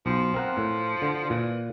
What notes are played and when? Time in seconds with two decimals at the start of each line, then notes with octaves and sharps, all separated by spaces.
0.06 B1 F3
0.34 C4 A#4 F#5
0.57 A2
1.02 D3
1.30 A#2 E3